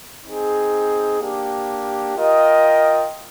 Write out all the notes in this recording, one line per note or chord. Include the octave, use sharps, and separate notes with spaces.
C4 D#4 G#4
A#3 D4 G4
F4 A#4 D#5 G5